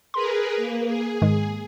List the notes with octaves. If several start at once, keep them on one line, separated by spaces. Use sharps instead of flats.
G#4 A#4 B4 C6
A#3
G#4
G#2 D#3 G#3